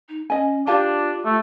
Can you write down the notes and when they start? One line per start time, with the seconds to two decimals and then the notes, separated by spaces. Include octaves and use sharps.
0.09 D#4
0.30 C#4 D#5 G#5
0.67 D4 F4 G4 F5 A5
1.25 A3